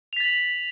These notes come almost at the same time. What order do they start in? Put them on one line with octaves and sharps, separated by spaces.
F7 B6 A6 F#7